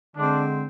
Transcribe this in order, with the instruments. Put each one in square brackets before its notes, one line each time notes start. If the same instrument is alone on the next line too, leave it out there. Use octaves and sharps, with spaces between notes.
[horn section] D3 G#3 C4 D4